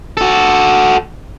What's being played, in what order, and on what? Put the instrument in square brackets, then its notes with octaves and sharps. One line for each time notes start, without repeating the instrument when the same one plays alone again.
[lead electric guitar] F#4 A4